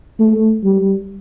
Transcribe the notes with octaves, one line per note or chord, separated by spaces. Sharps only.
A3
G3